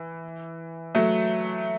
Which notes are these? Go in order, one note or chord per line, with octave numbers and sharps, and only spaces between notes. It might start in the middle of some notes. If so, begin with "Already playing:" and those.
Already playing: E3
F#3 A3